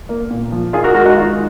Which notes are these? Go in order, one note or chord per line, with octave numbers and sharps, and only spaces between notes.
A#3
A#2
F3
D#3 F4 G#4
F#4 A#4
G#3 F#4 A#4
D#4 F#4
D#3 F4